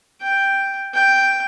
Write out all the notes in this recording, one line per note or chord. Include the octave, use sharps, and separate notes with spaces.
G5
G5